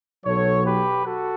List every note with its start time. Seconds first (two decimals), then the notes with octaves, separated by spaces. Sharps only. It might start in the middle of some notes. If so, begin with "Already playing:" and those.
0.25 B1 B2 F#3 A4 C#5
0.65 G4 B4
1.06 F#4 A4